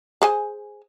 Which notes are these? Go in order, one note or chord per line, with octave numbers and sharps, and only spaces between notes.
G#4 C5 G#5